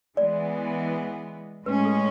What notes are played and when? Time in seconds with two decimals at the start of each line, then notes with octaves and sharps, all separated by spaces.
0.17 E3 G#3 B3 D5
1.66 A2 G#3 C#4 B4
1.85 A4